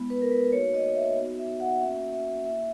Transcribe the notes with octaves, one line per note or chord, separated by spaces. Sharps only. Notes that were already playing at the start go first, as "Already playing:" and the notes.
Already playing: G#3 B3 E4
B4
A#4
B4
A#3 D#4 F#4 C#5
D#5
E5
B3 D#4 F#4
E5
F#5
A#3 C#4 F#4 E5
E5
A#3 E4 E5